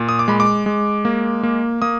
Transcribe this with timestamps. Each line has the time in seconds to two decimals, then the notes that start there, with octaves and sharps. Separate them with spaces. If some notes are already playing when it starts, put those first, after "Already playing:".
Already playing: A#2
0.09 D#6
0.19 D6
0.28 G#3 B5
0.40 D6
0.66 G#3
1.05 A#3
1.43 A#3
1.82 A#3 D#6